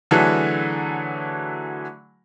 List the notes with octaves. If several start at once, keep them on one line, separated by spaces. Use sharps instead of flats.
D3 E3 F#3 A3 G#4